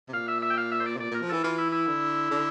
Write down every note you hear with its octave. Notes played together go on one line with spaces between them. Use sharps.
C3
A#2 F5
E5
E5
G5
F5
E5
C5
D5
C3
A#2 D5
A#2 A#4
F3
E3 A4
E3 F4
E4
E4
D3
D3